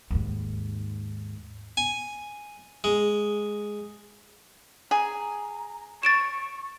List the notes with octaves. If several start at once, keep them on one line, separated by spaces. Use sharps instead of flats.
D#2 G#2
G#5
G#3
G#4 A#5
C#6 A6 D7 E7